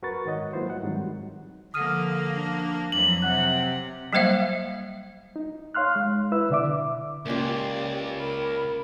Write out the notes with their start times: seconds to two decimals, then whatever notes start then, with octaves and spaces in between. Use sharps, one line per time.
0.02 F#2 F#4 A#4 B4 C#6 A6
0.25 G#2 D#3 F#4 C#5 D#5 F#5
0.53 F#3 A#3 E4 F4 B4 C5
0.70 G#2 G3 F#5
0.83 G#2 D#3 F#3 G3 C4
1.74 D3 F3 A#3 D#6 F6 D#7
2.35 D4
2.92 F2 E3 F#3 F#7
3.22 C3 F#5 F#6
4.13 F#3 G3 A#3 C5 E5 F5
5.36 D#4
5.74 C#5 F5 C6 F6 F#6
5.96 G#3
6.32 E4 B4 E5 E6
6.50 B2 D3 D5 E5 D6
7.26 C#2 A#3 C#4 F4 G4 D5
8.20 A#4 B5